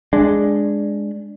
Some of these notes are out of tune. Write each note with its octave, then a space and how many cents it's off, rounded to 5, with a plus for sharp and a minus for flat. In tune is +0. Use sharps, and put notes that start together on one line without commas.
G#3 +0 D4 +0